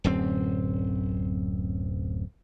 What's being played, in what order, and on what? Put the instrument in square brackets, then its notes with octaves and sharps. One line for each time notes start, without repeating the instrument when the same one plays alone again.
[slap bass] D1 F#2 C4